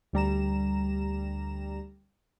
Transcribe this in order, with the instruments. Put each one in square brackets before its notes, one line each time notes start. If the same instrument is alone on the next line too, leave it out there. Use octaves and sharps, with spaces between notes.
[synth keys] D2 G3 A#5 E7